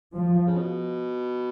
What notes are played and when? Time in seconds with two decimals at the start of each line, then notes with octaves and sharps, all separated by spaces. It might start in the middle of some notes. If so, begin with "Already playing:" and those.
0.14 F3
0.47 C#3
0.55 B2